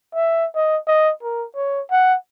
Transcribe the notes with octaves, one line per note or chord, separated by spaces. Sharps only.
E5
D#5
D#5
A#4
C#5
F#5